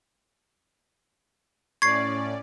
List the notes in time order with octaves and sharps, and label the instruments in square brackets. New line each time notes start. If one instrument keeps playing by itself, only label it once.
[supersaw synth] A2 C#4 D5 [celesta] C#6 [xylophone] G#6 C7